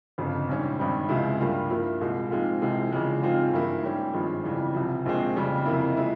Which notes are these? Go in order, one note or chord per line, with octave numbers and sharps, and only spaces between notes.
G1 F2 C#3
A#1 G#2 G3 C#4
G#1 G2 G3
C#2 C3 F3 G#3 E4
G2 G3 A#3 F4
G2 F3 A#3 E4
C2 A#2 G#3
G#2 F3 G#3 C4 F4
C2 C3 E3 G#3 C4
E2 C#3 F3 G#3
G#2 F3 G#3 C4 F4
G2 E3 A#3 E4
G#2 G3 C#4 G4
G#1 G2 F3 G#3
F2 C#3 E3 G3
C2 C3 F3
A#1 A#2 G#3 C4
F2 C#3 G3
F2 C3 E3 A#3 E4
F3 G#3 E4